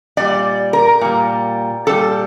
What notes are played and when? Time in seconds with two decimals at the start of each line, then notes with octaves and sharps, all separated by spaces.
0.17 A#2 G3 D5
0.73 A#4
1.01 A#2 G3
1.87 A#2 G3 A4